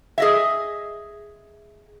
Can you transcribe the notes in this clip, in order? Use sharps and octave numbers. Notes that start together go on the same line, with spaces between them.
G#4 D#5 E5